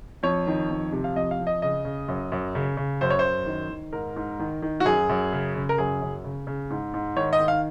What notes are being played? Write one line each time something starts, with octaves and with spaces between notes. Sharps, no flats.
F2 C#5
D#3
F2
C3
F5
F2 D#5
F5
F2
D#5
C#3 D#5
C#3
F#2
F#2
C#3
C#3
F#2 C5
C#5
F#2 C5
D#3
D#3
G#2 A#4
G#2
D#3
D#3
F#4
F#2 G#4
F#2
C#3
C#3
A#4
F#2 G#4
F#2
C#3
C#3
G#2
G#2
D#3 C#5
D#5
D#3
F5